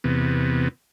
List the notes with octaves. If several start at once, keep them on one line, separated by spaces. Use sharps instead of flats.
E2 C3 B3